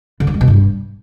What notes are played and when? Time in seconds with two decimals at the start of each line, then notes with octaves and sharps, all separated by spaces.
0.20 D3
0.27 F#3
0.34 G#3
0.41 B2
0.48 G2